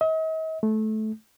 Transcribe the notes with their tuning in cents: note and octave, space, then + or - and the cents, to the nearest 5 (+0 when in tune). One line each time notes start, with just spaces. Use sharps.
D#5 +45
A3 -20